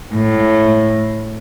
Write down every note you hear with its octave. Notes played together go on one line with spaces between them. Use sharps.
A2